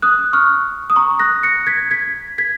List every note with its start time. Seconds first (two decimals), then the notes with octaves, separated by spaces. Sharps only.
0.02 D#6 F#6
0.33 C#6 F6
0.90 D#6
0.96 A#5 C#6
1.19 F#6 A#6
1.43 A#6 C#7
1.67 G#6 B6
1.91 G#6 B6
2.38 G#6 B6